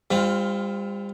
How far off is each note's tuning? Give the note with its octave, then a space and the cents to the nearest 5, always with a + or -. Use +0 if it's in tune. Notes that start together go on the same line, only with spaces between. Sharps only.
G3 +40 C4 -10 F4 +0